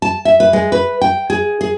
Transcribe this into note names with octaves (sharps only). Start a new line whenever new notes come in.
A5
E5
B4
G#3
B4
G5
G#4
G#4